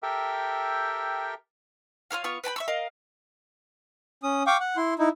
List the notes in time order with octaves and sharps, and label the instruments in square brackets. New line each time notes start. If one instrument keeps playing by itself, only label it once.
[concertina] G4 A4 A#4 E5 G5
[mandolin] F4 A#4 C#5 F5
B3 F4 C#6
B4 G5 A5 B5
E5 C#6 E6
A#4 D#5 F5
[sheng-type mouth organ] C#4 D#6
F5 G5 C#6 D6
F#5
E4 C6
D#4 E4